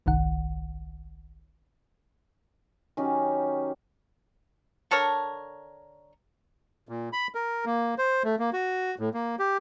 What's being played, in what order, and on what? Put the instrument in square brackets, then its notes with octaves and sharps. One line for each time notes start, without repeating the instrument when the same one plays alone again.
[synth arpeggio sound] G1 C2 D#3 F#5
[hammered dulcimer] D#3 F#3 C#4 G4
[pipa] D3 A4 A#4 C#5
[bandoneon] A#2
B5
A#4
A#3
C5
A3
A#3
F#4
A2
A#3
G4